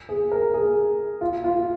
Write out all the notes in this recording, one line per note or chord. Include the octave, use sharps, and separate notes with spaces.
G#4
A#4
G#4
F4
F4